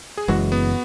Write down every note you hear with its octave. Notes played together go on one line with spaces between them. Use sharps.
G#4
F#1 F#2 E3 G#3 F#4
B3